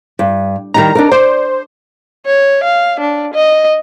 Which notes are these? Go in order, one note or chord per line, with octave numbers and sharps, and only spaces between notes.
G2
D#3 G3 D#4 A#5
D4 D#4 A#4
C5 D5
C#5
F5
D4
D#5